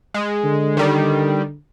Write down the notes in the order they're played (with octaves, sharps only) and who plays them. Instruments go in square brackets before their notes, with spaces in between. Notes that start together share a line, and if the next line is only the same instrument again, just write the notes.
[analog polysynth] G#3
[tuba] D3
[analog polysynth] D#3 G3